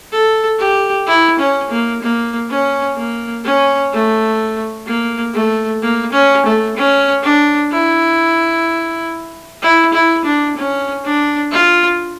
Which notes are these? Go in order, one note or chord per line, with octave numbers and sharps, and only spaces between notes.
A4
G4
E4
C#4
A#3
A#3
C#4
A#3
C#4
A3
A#3
A3
A#3
C#4
A3
C#4
D4
E4
E4
E4
D4
C#4
D4
F4